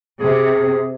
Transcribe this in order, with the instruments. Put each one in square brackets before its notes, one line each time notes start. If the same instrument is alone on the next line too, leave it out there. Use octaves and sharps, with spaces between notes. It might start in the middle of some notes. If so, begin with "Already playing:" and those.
[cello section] C3 [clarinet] G#4